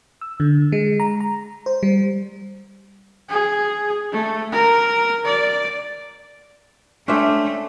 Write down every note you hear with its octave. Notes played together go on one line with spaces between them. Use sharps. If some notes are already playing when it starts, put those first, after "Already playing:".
E6
D3
G#3
A#5
A#5
C5
G3
G#4
A3
A#4
D5
A3 C#4 D4 C5 E5 G5